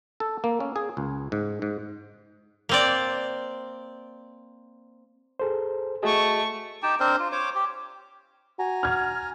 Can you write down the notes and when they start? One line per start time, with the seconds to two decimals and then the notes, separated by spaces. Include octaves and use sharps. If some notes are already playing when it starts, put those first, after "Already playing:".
0.20 A4
0.44 A#3
0.60 C#4
0.76 G#4
0.97 C#2
1.32 G#2
1.62 G#2
2.69 A#3 C4 D5
5.39 G#4 A4 C5
6.03 A3 F#4 G#4 D#5 C#6
6.83 D#4 G4 G5 A5
7.00 C4 D4 A#4 C5
7.19 F4
7.32 C5 C#5 D6
7.55 G4
8.59 F#4 G#5 A#5
8.83 F6 G#6